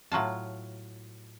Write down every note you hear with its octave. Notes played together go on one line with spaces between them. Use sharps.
A2 F#3 F4 A5